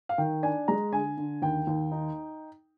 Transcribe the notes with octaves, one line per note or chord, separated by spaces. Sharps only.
F5
D#3 G5
D4 G#5
G#3 A#5
D3 G#5
D3
D#2 G5
D#2
D#4